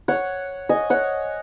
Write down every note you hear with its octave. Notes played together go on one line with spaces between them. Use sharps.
C#5 F#5
D#5 G#5
C#5 F#5